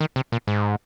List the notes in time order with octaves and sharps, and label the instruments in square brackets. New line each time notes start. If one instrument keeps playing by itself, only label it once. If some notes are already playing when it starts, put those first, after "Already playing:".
[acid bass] D#3
C3
A#2
G#2